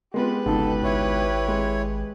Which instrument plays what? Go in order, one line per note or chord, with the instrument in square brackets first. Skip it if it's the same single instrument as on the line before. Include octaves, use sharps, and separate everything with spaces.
[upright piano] G#3 B3 F4 [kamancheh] G4 B4
[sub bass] G1 [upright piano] C#2 G#2 B2 [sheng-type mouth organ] A4
[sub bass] G#1 [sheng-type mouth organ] E4 C#5
[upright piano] G#3